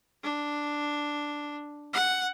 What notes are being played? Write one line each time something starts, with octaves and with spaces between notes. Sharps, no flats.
D4
F#5